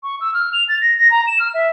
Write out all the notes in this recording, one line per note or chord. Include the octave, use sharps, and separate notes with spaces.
C#6
E6
F6
F7
A6
A#6
A#6
A#5
E7
F6
E5